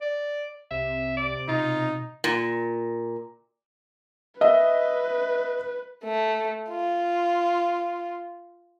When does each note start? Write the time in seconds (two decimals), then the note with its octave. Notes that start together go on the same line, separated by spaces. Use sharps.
0.01 D5
0.71 C2 C3 E5
1.17 D5
1.48 B2 D#4 F4
2.24 A#2
4.41 B4 D#5 E5
6.04 A3
6.70 F4